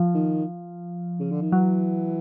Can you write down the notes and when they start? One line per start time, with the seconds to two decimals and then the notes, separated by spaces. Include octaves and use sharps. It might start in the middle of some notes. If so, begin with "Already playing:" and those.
Already playing: F3
0.14 D#3
1.20 C#3
1.31 D3
1.42 D#3
1.52 E3 F#3